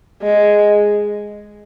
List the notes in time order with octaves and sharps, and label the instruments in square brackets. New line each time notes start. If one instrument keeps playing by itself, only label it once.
[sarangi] G#3